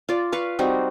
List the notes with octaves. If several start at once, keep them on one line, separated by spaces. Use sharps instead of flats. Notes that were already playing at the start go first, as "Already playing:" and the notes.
F4 D5
B4 F5 C#6
G3 C4 D#4 F#4